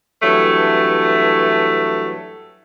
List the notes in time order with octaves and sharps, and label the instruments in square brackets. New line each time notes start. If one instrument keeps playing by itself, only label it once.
[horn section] G2 E3 F#3 A3